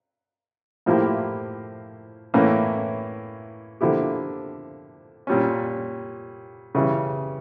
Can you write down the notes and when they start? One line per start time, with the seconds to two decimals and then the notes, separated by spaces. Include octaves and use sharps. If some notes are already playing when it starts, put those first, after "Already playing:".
0.86 A2 F3 A#3 E4 G4
2.34 A2 E3 A#3 C#4
3.81 D3 F3 A#3 E4 G4
5.27 A#2 G3 C#4
6.75 C#3 E3 G3